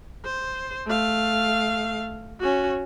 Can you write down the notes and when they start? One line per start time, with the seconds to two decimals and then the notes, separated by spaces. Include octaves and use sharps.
0.25 C5
0.87 A3 F5
2.40 C#4 F#4